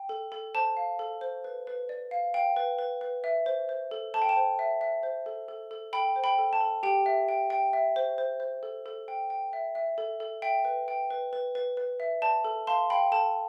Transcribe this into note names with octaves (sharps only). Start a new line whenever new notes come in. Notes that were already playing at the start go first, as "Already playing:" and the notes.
Already playing: G5
A4
A4
C5 A5
F5
A4
C5
B4
B4
D5
F5
F5 G5
B4
B4
B4
E5
C5
C5
A4
A4 A5
G5
A5
C5
E5
E5
C5
A4
A4
A4
A4 G5 B5
C5
G5 B5
A4
A5
A4
G4 G5
E5
G5
G5
E5
C5
C5
C5
A4
A4
G5
G5
E5
E5
A4
A4
E5 G5
B4
G5
B4
B4
B4
B4
E5
D5 A5
A4
F5 A5 C6
F5 G5 B5
A4 A5